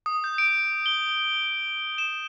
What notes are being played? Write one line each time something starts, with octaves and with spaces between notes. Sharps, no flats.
D#6
G6
D7
G7
E7